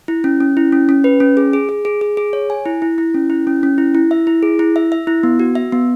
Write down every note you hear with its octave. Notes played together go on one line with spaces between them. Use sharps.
E4
C#4
C#4
E4
C#4
C#4
B4
C#4
G#4
G#4
G#4
G#4
G#4
G#4
C#5
G#5
E4
E4
E4
C#4
E4
C#4
C#4
E4
E4
E5
E4
G#4
E4
E5
E5
E4
B3
F#4
E5
B3